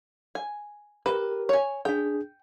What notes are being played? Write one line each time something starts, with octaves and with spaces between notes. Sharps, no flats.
G#5
G4 A#4 B4
C#5 G#5
D4 G#4 G5